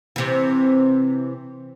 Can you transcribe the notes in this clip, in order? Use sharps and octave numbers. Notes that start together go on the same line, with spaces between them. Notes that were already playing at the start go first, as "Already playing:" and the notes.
C3 E3